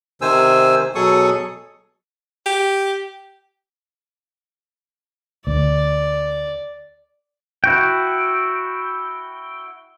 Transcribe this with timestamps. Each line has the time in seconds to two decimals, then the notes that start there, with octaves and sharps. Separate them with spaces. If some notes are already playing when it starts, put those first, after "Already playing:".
0.21 C3 D#3 C5 G#5 E6
0.95 B2 F#3 G#4 A4 C#6 D#6
2.46 G4
5.47 D2 D5
7.64 E4 F#4 G5